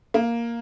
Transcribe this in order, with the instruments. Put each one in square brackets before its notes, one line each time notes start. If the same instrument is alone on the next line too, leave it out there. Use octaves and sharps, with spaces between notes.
[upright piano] A#3